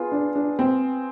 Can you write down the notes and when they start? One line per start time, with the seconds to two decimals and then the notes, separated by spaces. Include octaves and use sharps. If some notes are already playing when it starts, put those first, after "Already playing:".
Already playing: B3 F4 G#4
0.12 D4
0.35 D4
0.59 C4